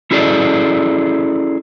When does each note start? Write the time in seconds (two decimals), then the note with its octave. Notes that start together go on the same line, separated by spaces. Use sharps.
0.11 C#4 E4 F#4 G#4 A4 D5